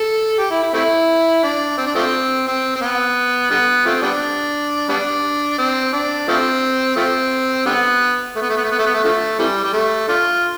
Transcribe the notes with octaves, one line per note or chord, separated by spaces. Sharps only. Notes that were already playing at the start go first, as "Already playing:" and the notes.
Already playing: A4
G4
E4
E4
A3 C4 E4
D4
C4
D4
F3 A3 C4
C4
C4
B3
D3 G3 B3
F3 A3 C4
G3 B3 D4
G3 B3 D4
C4
D4
F3 A3 C4
F3 A3 C4
D3 G3 B3
A3
B3
A3
B3
A3
B3
A3
B3
A3
D3 F3 A3
C3 E3 G3
G3
A3
A3 D4 F4